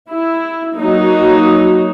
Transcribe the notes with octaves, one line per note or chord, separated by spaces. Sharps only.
E4
F#3 A#3 D#4 F#4